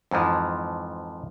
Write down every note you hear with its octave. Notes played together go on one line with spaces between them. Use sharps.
F2 G#2 E3 F3